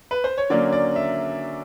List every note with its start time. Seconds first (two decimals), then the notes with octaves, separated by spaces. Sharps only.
0.11 B4
0.24 C5
0.38 C#5
0.50 D3 F#3 A#3 C#4 D5
0.73 D5
0.96 E5